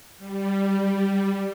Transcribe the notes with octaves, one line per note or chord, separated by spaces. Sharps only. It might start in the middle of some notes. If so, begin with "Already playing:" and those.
G3